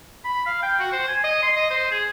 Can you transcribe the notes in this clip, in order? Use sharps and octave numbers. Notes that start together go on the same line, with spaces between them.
B5
F5
G5
F#4
C5
G#5
D#5
C6
D#5
C5
G#4